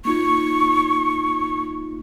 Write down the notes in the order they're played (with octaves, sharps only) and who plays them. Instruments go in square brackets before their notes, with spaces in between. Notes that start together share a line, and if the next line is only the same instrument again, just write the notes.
[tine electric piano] A#3 D#4 F4 [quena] C#6